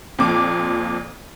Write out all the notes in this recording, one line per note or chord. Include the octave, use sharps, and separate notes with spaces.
F2 A#2 D6